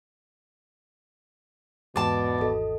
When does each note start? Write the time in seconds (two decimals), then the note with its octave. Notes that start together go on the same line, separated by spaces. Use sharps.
1.96 E2 G#2 B2 D5 A5
2.39 G#1 E2 F#4 A4 D#5